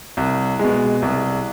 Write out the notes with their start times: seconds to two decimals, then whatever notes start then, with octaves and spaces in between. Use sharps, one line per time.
0.17 C2
0.59 B2 G#3
1.02 C2